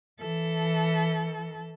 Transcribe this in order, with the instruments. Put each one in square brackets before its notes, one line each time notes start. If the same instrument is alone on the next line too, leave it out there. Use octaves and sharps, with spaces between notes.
[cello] E3 A4